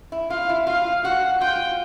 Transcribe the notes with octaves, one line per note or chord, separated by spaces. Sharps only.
E4
F4 F5
E4
F4 F5
F#4 F#5
F4 G5